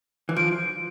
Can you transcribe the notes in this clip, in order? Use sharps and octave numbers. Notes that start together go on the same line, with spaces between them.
E3
F3 D7